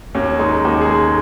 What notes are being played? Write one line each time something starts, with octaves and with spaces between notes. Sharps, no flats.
D#2 C#4
G#3 D#4
D#2 D#4
G#4
G#3